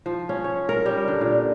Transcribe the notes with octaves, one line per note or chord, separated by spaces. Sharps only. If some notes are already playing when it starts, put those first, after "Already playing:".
F3
C#4
C#5
A#4
G3
D3
A#2